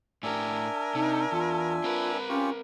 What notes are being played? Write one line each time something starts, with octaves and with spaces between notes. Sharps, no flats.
A2 D4 G4 A#4 E5 G#5
C3 D#4
E2 F4
C4 A#4 B4
C#4 F4 G4 C#6